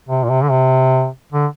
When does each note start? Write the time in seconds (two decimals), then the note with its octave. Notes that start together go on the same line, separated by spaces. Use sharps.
0.09 C3
0.24 A#2
0.30 C3
0.43 D3
0.50 C3
1.32 D3